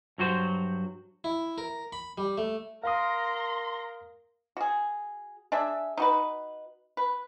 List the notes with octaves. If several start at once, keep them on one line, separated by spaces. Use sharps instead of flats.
G2 F#3 F#4 C5 C6
E4
A#4
B5
G3
A3
A#4 F5 A#5 C6 D#6
F#4 G#4
D4 G#4 E5
D#4 F#4 B4
B4